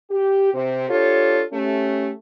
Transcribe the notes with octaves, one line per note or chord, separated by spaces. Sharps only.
G4
C3
D4 F4 G4 A4 C#5
A3 C#4 G4